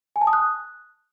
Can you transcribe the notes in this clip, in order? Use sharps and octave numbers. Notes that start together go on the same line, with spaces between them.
G#5
A5
D#6
F#6